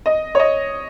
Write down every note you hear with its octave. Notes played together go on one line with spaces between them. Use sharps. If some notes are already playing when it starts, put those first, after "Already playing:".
D#5
C#5
D#5